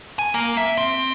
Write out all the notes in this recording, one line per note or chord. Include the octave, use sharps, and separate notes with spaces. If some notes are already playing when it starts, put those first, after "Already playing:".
G#5
A#3
E5
C4